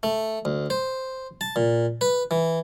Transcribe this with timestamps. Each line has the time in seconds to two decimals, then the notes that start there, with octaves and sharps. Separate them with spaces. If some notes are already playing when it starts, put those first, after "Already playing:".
0.03 A3
0.45 D2
0.70 C5
1.41 A5
1.56 A#2
2.01 B4
2.31 E3